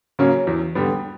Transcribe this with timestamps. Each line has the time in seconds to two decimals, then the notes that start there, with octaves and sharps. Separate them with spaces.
0.19 C#3 F#3 A#3 C#4
0.47 E2
0.75 D3 G3 B3